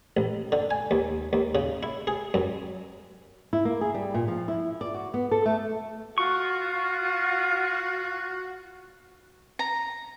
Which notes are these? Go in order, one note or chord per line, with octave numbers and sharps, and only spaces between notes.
A1
D3
G#5
D#2
D#2
C#3
E4
G#4
F#2
E4
A#3
G#4
G3
A#2
F3
E4
D5
F#4
B3
A4
A3
F4 F#4 C#6
A#5